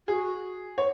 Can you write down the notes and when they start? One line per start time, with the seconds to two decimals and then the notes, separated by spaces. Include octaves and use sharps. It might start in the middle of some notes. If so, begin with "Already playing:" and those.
0.08 F#4 G#4
0.78 C#5